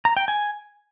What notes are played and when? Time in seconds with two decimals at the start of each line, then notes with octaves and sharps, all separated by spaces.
0.05 A#5
0.17 G5
0.28 G#5